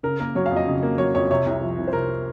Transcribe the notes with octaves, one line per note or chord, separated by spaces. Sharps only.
C#3 A#4
A#3 A#4
F#3 C#5
F5
F2
D#5
C#3
A#3
F#3 C#5
F2 C#5
C3 C#5
C2
F3
C2
C5
C3 A#4